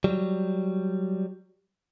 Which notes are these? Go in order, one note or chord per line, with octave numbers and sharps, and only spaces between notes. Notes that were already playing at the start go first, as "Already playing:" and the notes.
F#3 G3